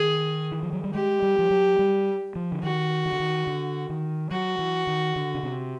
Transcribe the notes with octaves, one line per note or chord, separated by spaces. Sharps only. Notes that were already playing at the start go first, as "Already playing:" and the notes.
Already playing: D#3 G#4
E3
F3
F#3
G3
G#3 G4
G3
F3
F#3
G3
F3
D3
D#3 F#4
D#3
D3
D#3
D3
D#3
F#3 F#4
E3
D#3
D3
C#3
C3